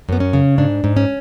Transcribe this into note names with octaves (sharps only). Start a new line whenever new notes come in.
F#2 B3
C#4
C#3
G#2 D4
G#2
C#4